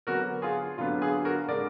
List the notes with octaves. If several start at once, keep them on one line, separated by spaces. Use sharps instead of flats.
D3 F#3 B3 D4 F#4 A#4
F4 G#4
D3 F#3 B3 D4 F4
F4 G#4
F#4 A#4
D3 G#3 D4 A#4 D5